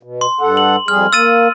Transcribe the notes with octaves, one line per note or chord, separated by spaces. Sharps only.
B2
C6
G2 A4 F#5
F#7
F2 G3 G#4 F6
A#3 E6 A6 D#7